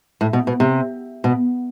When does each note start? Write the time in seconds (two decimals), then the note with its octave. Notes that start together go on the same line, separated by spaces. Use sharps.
0.21 A2
0.33 B2
0.47 B2
0.60 C3
1.24 B2